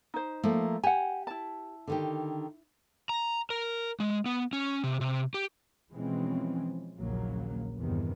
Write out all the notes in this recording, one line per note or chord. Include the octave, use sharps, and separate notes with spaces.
D#4 C5
F3 A3 A#3
G4 F#5 G#5
E4 A5
D3 D#3 G4
A#5
A#4
G#3
B3
C#4
C3
C3
G4
B2 E3 F3 G#3 C4 C#4
A#1 D#2 C#3 F#3 A#3
E2 G2 C3 D#3